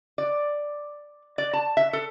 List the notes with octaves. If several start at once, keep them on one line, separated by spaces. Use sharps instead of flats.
D5
D5
A5
E5
A4